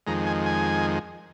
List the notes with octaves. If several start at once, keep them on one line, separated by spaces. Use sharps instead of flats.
F2 D#3 G#3 A#5
G#5
G#5